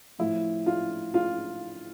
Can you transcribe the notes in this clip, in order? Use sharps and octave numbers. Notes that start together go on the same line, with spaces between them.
A2 F3 E4
F4
F4